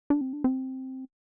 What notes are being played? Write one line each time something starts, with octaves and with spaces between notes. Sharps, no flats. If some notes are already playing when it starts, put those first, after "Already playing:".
D4
C4
D4
C4